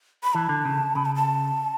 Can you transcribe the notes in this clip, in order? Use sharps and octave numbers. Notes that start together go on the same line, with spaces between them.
B5
E3 A5
D3
C#3
C#3 B5
A5
A5